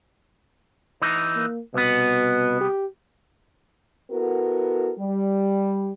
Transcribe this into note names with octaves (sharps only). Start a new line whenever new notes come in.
E3 D#4
A#3
C2 B2 B3
G4
B3 E4 F#4 A4 A#4
G3